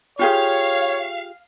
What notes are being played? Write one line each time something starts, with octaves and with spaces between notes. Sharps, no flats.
F4 G4 G#4 C#5 F5